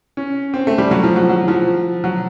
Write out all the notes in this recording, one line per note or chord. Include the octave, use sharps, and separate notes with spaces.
C#4
C4
A3
G3
F#3
F3
F#3
F#3
F3
F#3